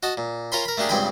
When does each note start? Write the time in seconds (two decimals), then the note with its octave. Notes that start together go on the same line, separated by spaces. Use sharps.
0.03 F#4 D#5 A5
0.17 A#2
0.52 F4 A#4 C#5 G#5 B5 C6
0.65 A#4 B5
0.77 A3 A#3 D4 G4 G#4
0.89 C#2 G2 C4 G5 G#5 B5